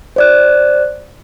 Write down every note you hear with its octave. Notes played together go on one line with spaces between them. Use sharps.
C5 D5 F#6